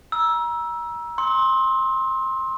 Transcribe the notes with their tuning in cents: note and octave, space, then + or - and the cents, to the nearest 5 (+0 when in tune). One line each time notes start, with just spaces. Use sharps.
A#5 +35 E6 +0
C6 +20 E6 -35